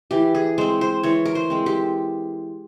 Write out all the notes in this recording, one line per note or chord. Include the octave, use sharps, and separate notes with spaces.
E3 G4
G#4
G#3 C4 C5
C5
E3 C#5
A#4
C5
G#3 C4
G4